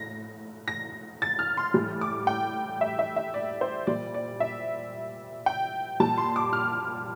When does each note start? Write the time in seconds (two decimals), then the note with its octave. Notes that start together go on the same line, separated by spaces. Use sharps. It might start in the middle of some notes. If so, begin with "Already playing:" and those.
Already playing: A2 A#6
0.68 A#6
1.22 A6
1.39 F6
1.57 C6
1.74 A2 E3 G3
2.01 D6
2.27 G5
2.81 E5
2.99 E5
3.16 E5
3.34 D5
3.61 C5
3.87 A#2 G3 D5
4.14 D5
4.40 E5
5.46 G5
6.00 A#2 G3 A5
6.18 C6
6.36 D6
6.53 F6